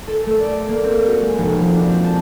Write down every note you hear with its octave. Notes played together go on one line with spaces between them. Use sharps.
A4
A3
D5
A#3
C4
F#4
G#3
F1
F3
D4
C4
A5